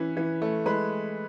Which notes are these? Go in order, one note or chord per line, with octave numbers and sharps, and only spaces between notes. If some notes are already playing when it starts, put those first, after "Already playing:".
Already playing: E3 C#4 B4
E3
A3
G#3 B4